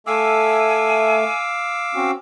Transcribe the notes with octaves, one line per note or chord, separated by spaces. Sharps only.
A3 E5 F5 G#5 D6 E6
C4 C#4 F#4